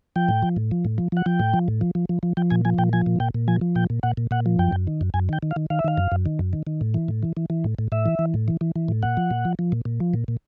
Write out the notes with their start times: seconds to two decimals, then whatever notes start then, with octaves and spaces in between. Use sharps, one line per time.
0.16 F3 G5
0.29 A2
0.43 F3
0.56 A2
0.71 F3
0.85 A2
0.98 F3
1.12 F3 F#5
1.26 F3 G5
1.40 A2
1.54 F3
1.68 A2
1.81 F3
1.95 F3
2.09 F3
2.23 F3
2.37 F3 G5
2.51 A#2 G#5
2.65 F3 G#5
2.78 A#2 G5
2.93 F3 G#5
3.06 A#2
3.20 A#2 G5
3.34 A#2
3.48 F3 G#5
3.61 F3
3.75 A#2 G5
3.90 A#2
4.03 A#2 F#5
4.17 A#2
4.31 A#2 F#5
4.46 F3
4.59 F#2 G5
4.72 F#2
4.87 D#3
5.01 F#2
5.14 F#2 G#5
5.29 D#3 G5
5.43 D#3
5.51 F5
5.56 D#3
5.70 D#3 F5
5.79 E5
5.84 D#3 F5
5.97 F#2
6.12 F#2
6.26 D#3
6.39 F#2
6.53 D#3
6.67 D#3
6.81 A2
6.94 E3
7.08 A2
7.23 E3
7.37 E3
7.50 E3
7.64 A2
7.79 A2
7.92 A2 E5
8.06 E3
8.19 E3
8.34 A2
8.48 E3
8.61 E3
8.76 E3
8.88 A2
9.03 A#2 F#5
9.17 F3
9.31 A#2
9.45 F3
9.59 F3
9.72 A#2
9.85 A#2
10.00 F3
10.14 A#2
10.28 A#2